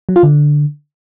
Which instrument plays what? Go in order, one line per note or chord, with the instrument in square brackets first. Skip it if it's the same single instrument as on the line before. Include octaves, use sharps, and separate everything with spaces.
[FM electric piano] F#3
F4
D3